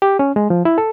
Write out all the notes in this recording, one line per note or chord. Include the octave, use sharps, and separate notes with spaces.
G4
C#4
G#3
F3
E4
A4